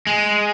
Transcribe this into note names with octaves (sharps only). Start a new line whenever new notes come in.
G#3